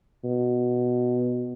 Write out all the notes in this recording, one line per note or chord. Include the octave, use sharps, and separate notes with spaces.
B2